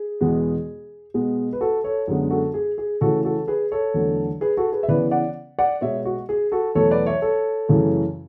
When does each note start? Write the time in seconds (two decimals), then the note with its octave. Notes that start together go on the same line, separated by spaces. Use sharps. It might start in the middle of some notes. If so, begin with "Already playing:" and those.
Already playing: G#4
0.21 E2 B2 G#3 B3
1.14 B2 G#3 B3
1.53 B4
1.61 F#4 A4
1.84 A4 C#5
2.08 F#2 D3 G#3 B3
2.30 F#4 A4
2.54 G#4
2.78 G#4
3.01 C#3 E3 A3 F#4 A4
3.24 F#4 A4
3.48 G#4 B4
3.72 A4 C#5
3.94 E2 D3 F#3 A3
4.41 G#4 B4
4.57 F#4 A4
4.72 G#4 B4
4.83 E5
4.88 C#3 E3 B3 B4 D5
5.11 D5 F#5
5.59 D5 F#5
5.81 B2 G#3 B3 C#5 E5
6.05 F#4
6.29 G#4
6.52 F#4 A4
6.75 E2 B2 F#3 A3 A4 C#5
6.91 B4 D5
7.06 C#5 E5
7.22 A4 C#5
7.68 F#2 C#3 E3 A3